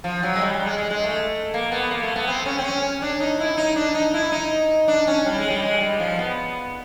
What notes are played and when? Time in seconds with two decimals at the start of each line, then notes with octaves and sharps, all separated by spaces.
0.04 F3
0.23 F#3
0.36 G#3
0.41 G3
0.54 G3
0.66 G#3
0.78 G#3
0.91 G#3
1.04 A3
1.54 A#3
1.72 B3
1.91 A#3
2.03 A3
2.16 B3
2.28 C4
2.46 C#4
2.58 C4
2.64 C#4
3.02 D4
3.20 D#4
3.40 E4
3.57 D#4
3.76 D4
3.95 D#4
4.14 E4
4.32 D#4
4.88 D4
5.07 C#4
5.26 G3
5.38 G#3
5.50 G3
5.62 G#3
5.81 G3
6.00 F3
6.19 B3